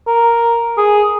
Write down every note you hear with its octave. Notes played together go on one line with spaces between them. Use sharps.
A#4
G#4